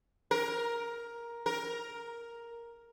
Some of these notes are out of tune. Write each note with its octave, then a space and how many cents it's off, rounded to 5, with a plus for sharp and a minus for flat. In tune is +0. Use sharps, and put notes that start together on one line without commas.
A#4 +10
A#4 +5